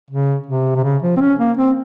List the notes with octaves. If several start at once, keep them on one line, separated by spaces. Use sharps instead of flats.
C#3
C3
C3
C#3
F3
C4
C#4
A#3
C4